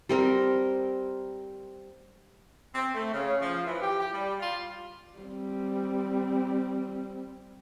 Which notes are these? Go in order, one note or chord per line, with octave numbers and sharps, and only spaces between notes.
G3 C4 A#4
C4
A3
C#3
F3
E3
G4
G4
G3
F4
G3 C4